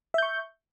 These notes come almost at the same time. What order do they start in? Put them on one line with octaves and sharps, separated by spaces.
E5 G6 C#6